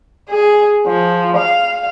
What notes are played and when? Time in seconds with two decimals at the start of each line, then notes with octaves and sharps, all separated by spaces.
0.30 G#4
0.87 F3
1.37 F5